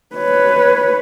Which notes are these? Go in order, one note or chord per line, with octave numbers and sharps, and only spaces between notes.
B4 C#5